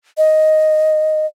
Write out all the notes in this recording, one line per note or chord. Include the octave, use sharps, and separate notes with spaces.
D#5